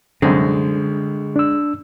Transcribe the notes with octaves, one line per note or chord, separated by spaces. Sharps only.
C2 F#2 D3 G#3
D4 E6